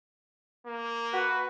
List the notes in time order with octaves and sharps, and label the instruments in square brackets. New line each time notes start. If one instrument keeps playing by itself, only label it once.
[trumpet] A#3
[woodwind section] F#4 B4